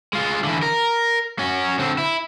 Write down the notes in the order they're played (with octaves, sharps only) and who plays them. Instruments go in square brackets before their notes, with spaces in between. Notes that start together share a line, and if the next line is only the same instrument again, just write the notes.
[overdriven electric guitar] G#3 F4
D3 E3
A#4
C#4 F#4
D3 C4
E4